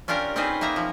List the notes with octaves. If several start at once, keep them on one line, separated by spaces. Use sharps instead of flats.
C#4 D4 F4 G4 A#4
C4 C#4 D#4 G#4 B4 C5
A#3 D#4 E5 A#5
F3